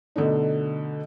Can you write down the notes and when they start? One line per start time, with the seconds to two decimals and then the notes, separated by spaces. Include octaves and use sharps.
0.16 B2 D3 A3 D4 D#4